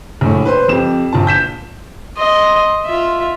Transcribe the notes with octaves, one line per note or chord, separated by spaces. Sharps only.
A#1 A2
B4 C5 C6
F2 G4 E7
A#1 F4 A5
G6 B6 E7
D#5 C6
F4 E5